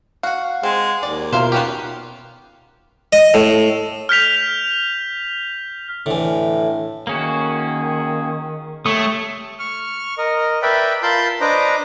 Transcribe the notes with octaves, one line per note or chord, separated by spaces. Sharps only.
F#4 F5 F#5
G#3 C4
D#2 D5
B2 F4 A#4 C5 E5 F5
B3 C#4 G4
D#5
A2
F6 G6 B6 F7
A2 D3 E3
D#3 A#3 C#4 F#4 G#4
A3 G4 C#5 C#6 D#6
C#6 F6
A#4 D#5
A#4 B4 D5 E5 G5 B5
F4 A#4 A5 B5 C6 G6
D4 B4 C5 D#5 A#5 D6